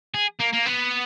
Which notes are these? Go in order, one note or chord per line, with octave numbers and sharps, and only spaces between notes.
G#4
A#3
A#3
B3